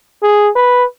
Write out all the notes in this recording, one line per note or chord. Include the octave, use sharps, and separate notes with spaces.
G#4
B4